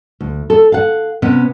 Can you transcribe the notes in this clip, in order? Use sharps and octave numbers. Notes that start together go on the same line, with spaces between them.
D2
A4
F5 F#5
C3 B3 C#4